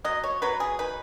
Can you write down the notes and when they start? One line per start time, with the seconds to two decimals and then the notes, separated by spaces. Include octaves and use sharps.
0.04 F#3 D#5
0.24 C#5
0.42 F#3 B4
0.60 G#4
0.79 D#4 B4